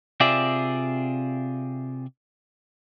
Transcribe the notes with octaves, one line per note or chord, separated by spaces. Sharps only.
C3 C4 F4 G#4 D5 E5